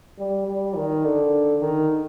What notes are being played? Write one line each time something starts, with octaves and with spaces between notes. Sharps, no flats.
G3
G3
D#3
D3
D#3